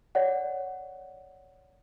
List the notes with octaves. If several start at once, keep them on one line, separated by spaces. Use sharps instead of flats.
C#5 D5 F#5